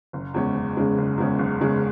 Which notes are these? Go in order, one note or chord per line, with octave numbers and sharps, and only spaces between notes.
F#1
E2 C#3 G#3 C#4
F#1
E2 C#3 G#3 C#4
F#1
E2 C#3 G#3 C#4
F#1
E2 C#3 G#3 C#4